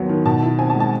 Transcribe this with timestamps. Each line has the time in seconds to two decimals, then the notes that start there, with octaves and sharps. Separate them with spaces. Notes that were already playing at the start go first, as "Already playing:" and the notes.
Already playing: D#2 F#3 B3
0.09 D#3
0.25 B2 A5
0.43 E4
0.59 C4 G#5
0.70 A5
0.75 G#3
0.80 A5